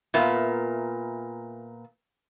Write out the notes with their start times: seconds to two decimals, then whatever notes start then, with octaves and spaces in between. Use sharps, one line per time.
0.14 A#2 B3 A#4 E5